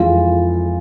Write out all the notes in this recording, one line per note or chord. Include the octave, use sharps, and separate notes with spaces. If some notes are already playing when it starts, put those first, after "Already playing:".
Already playing: F2 E3 G#3 F4